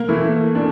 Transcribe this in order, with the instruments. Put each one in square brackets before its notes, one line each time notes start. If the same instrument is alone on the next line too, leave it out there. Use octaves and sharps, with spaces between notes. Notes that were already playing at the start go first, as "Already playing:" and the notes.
Already playing: [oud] A#3
[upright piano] E3 A3 E4
A#2 A3 D4